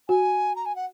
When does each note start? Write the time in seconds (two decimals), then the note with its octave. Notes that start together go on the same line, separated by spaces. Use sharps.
0.08 F#4 G#5
0.55 A#5
0.65 G#5
0.75 F#5